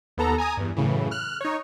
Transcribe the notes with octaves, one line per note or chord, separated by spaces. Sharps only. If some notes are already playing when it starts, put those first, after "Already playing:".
D#2 B3 A4 A#5
G#5 A#5 D#6
E2 G2
F#2 A2 C#3 E3
F6 F#6
D#4 C#5